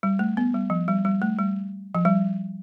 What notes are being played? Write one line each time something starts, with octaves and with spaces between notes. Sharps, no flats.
G3
A3
B3
G3
F3
G3
G3
A3
G3
F3
G3